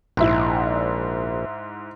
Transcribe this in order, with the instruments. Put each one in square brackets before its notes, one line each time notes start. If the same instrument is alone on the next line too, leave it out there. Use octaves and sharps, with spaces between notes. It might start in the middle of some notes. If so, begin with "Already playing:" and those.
[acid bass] A#1 [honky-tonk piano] G#2 E4